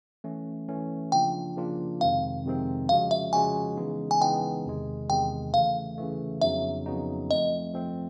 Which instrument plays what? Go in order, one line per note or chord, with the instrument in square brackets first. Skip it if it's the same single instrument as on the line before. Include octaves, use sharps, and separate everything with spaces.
[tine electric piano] E3 A3 C#4
E3 A3 C#4
[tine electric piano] C#3 F3 A#3 D4 F4 [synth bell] G5
[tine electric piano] C#3 F3 A#3 D4 F4
[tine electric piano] F2 C3 D#3 G#3 C4 [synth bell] F5
[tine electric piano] F2 C3 D#3 G#3 C4
[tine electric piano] C#3 F3 G#3 C#4 F#4 [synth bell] F5
[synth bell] E5
[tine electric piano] C#3 F3 G#3 C#4 F#4 [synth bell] G#5
[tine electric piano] C#3 E3 G#3 B3 D#4
[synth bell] G#5
[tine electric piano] C#3 E3 G#3 B3 D#4 [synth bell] G5
[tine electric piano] E2 C3 D#3 G#3
[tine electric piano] E2 C3 D#3 G#3 [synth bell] G5
[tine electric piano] C#3 E3 A3 [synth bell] F5
[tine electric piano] C#3 E3 A3
[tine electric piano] F2 C#3 F#3 B3 D#4 [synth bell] E5
[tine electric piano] F2 C#3 F#3 B3 D#4
[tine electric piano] F3 A3 C4 [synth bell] D#5
[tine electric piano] F3 A3 C4